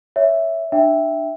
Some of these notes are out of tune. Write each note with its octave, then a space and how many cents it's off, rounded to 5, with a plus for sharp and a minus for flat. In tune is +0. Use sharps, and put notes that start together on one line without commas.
C#5 +10 E5 +0
D4 +20 E5 +0 G5 +5